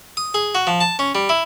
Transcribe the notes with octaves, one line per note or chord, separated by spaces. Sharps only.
D#6
G#4
F#4
F3
A5
C#4
G3
E4